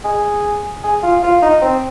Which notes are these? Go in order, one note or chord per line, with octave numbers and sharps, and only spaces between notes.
G#4
G#4
F4
F4
D#4
C4